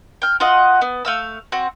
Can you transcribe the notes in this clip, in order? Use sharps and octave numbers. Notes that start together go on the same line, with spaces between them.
G5 F6
F4 F#4 D#5 F#5
B3
A3 F5 E6
C4 F#4